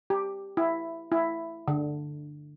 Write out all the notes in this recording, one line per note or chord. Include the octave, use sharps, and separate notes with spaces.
G4
E4
E4
D3